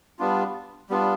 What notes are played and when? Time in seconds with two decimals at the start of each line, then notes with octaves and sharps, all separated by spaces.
0.19 G3 B3 D4 F4
0.90 G3 B3 D4 F4